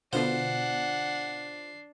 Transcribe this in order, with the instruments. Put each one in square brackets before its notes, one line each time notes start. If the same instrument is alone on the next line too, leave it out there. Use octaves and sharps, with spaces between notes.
[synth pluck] B2 D3 B3 [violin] D4 C7 [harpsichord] F4 C5 [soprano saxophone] F#5